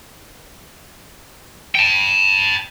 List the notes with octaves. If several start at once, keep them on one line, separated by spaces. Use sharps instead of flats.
G5 A5